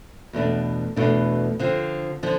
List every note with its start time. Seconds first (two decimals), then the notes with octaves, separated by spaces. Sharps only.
0.33 E2 B2 A3 D4
0.96 E2 B2 A3 D4
1.59 D3 F3 C4
2.23 D3 F3